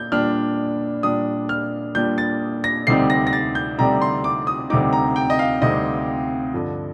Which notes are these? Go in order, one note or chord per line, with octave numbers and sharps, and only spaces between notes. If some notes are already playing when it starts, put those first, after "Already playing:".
Already playing: A#2 G6
A#2 G3 D4 F6
A#2 G3 D4 D#6
F6
A#2 G3 D4 G6
A6
A#6
D2 C3 G3 C4 D#4 C7
A#6
A#6
A6
G6
D2 C3 G3 C4 D#4 A#5
C6
D6
D#6
D2 C3 G3 C4 D#4 D6
A#5
G5
D#5
F5
D2 C3 G3 C4 D#4 D#5
G2 D3 F3